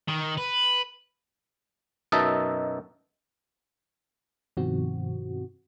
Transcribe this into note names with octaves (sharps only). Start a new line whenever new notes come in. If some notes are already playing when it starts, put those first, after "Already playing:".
D#3
B4
F#2 B2 D#4 D#5 E5 A5
G2 B2 D#3 F3 C4 F#4